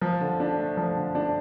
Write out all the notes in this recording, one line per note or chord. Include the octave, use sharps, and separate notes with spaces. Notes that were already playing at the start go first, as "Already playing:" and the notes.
F3
D3
D4
A3
F3
D3
D4